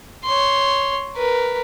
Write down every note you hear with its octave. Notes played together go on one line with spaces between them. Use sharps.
C#5 C6
A#4 B4